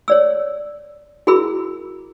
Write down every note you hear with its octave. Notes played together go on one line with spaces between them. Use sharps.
C#5 D5 E6
E4 F#4 G#4 A#4 B5 E6